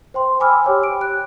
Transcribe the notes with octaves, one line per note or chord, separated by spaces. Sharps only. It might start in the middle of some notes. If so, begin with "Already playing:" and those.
C5 G5 C6
G#5 B5 D6 E6 F6
G4 C#5 G5
D7
F#6